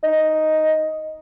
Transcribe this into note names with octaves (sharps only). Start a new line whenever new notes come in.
D#4